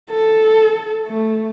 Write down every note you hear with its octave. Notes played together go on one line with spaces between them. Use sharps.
A4
A3